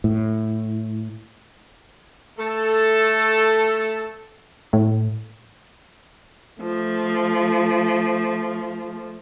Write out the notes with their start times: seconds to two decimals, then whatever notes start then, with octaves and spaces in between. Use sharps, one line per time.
0.04 A2
2.38 A3 A4
4.73 A2
6.61 F3 A3